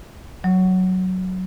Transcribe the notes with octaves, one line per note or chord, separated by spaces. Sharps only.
F#3